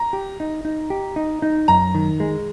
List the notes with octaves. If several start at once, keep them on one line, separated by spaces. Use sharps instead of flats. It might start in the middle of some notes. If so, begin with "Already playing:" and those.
Already playing: A#5
G4
D#4
D#4
G4
D#4
D#4
F#2 A#5
D#3
G#3